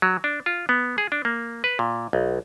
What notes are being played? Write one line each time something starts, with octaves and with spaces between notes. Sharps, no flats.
F#3
D4
F4
B3
G#4
D4
A#3
B4
A#2
B1